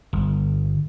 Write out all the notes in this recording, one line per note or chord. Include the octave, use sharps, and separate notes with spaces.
G1